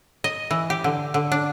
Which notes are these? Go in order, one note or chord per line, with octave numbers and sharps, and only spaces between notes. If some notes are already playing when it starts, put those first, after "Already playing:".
D#5
E3
G4
D3
D3
D4